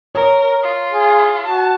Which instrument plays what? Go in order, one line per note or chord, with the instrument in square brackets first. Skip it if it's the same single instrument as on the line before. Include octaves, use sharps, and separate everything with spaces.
[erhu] A#4 [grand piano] C#5
[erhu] F4
[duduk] G#4
[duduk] F#4 [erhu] A5